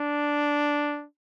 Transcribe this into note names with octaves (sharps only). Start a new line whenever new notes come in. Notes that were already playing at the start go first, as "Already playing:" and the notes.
Already playing: D4